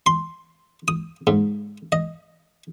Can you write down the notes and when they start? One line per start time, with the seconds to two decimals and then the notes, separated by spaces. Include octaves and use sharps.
0.06 C6
0.88 D#6
1.27 G#2
1.92 D#5